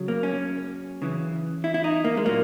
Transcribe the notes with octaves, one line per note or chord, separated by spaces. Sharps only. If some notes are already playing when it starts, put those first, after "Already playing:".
Already playing: C#3 F#3
A#3
C#4
C#3 E3
E4
E4
D#4
A#3
G#3
A#2 F#3 A#3